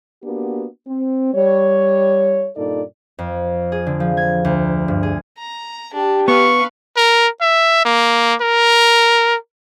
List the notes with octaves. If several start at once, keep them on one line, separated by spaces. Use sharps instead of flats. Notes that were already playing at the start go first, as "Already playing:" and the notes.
A#3 B3 D4 F#4 G4
C4
G3 C#5
G2 A#2 D#4 A4 D5
F2
G#4
D3
F3
G#6
D2
G2
G#4
A#5
D4 G4
B3 B4 F5 C#6
A#4
E5
A#3
A#4